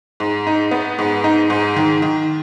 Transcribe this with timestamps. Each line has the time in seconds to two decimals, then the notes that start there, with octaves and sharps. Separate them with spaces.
0.20 G#2
0.47 D#4
0.71 B3
0.99 G#2
1.24 D#4
1.50 G#2
1.76 D#3
2.02 D#3